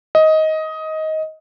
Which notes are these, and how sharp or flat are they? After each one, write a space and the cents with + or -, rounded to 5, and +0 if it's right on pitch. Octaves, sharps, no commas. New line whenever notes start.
D#5 +15